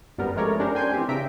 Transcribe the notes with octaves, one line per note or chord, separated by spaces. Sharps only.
G1 F#2 G3 B3 A#4
F3 G#3 A3 A#4 C#5 D5
C#4 D4 G4 A#4 C5
G5 G#5 C6 G6
E3 C4 G4
C#3 D4 E5 A#5 B6 D7